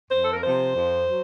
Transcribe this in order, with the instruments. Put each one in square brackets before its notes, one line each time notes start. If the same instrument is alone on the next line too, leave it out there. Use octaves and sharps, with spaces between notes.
[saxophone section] F2 C5
A4
A#4
C3 F3 C5
F2
F#3